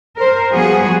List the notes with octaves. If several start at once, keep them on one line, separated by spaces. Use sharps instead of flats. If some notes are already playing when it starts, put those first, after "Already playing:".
A#4 C5
F3 G3 B3 F#4 G#4